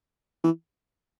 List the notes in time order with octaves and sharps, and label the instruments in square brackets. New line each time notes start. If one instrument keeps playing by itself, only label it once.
[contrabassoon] E3